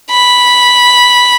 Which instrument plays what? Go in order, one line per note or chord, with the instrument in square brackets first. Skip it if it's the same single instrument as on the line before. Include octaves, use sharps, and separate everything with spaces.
[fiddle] B5